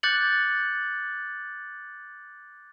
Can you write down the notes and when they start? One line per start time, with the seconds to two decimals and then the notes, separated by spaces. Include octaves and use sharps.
0.03 D6 F#6 G6 A6 C#7 F#7